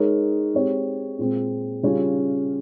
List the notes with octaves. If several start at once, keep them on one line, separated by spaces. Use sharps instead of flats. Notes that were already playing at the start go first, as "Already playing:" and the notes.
Already playing: G#3 D#4 A#4 C#5
G#3 C4 G4 C#5
A#2 G#3 C4
C#3 G3 C#4 F4